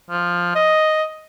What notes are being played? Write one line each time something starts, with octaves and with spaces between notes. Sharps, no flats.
F3
D#5